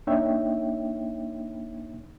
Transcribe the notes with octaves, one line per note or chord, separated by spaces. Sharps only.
A#3 D4 D#4 C#5 E5 G5